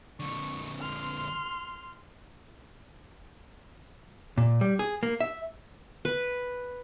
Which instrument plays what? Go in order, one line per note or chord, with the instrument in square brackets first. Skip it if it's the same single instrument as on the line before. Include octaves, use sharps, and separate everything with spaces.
[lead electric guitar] F2 D3 [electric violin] C#6
[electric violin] C6 F6
[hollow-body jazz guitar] A#2
G3
G#4
A#3
E5
[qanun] B4